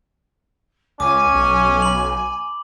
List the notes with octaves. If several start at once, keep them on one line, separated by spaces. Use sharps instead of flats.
C#2 C#4 G#5 D6
B1
B5 F#7